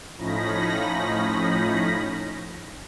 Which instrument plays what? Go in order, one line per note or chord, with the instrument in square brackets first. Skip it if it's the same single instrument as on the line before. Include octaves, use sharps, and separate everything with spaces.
[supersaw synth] A2 F3 C#4 D#4 B5 A#6